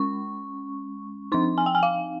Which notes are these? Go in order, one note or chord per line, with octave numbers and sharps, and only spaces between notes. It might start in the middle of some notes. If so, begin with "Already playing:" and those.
Already playing: G#3 C#4 C#6
F3 C4 D#4 C6
G#5
G5
G#5
F5